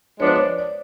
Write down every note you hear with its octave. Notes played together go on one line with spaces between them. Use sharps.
F3 G#3 B3 D4 C#5
C5
C#5
D5